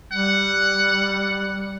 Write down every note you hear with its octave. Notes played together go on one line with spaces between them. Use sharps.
G3 F#5